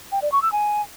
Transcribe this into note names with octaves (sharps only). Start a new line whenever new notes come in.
G5
D5
C#6
E6
G#5